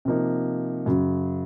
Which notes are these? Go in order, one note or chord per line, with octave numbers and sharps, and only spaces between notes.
C3 F3 A#3 D#4
F#2 C#3 F#3